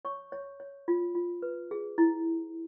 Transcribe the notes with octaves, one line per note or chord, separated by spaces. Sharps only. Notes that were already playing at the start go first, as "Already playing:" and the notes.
C#5 C#6
C#5
C#5
F4
F4
B4
G#4
E4